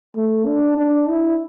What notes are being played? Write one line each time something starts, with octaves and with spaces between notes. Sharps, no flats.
A3
D4
D4
E4